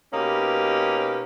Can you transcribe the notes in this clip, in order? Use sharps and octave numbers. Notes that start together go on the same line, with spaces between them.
B2 A#3 C#4 D#4 G4 B4